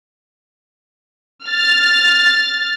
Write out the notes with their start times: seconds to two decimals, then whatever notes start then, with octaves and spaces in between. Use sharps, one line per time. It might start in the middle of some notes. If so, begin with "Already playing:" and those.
1.46 F6 A6